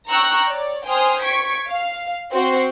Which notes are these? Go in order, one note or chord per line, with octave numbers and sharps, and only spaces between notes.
G5 A#5 C#6 E6 F#6
C#5 D5
C5 G5 G#5 C6 D#6 F6
C#6 G#6 B6 D7
F5
C4 F#4 C5 C6